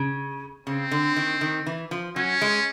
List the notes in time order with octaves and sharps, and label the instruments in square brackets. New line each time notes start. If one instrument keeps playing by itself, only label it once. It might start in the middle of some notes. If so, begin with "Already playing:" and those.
Already playing: [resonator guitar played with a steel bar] C#3
[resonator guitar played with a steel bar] C#3 [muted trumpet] C4
[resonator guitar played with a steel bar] D3
D#3
D#3
E3
F3
[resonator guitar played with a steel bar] F#3 [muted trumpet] C#4
[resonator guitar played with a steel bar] G#3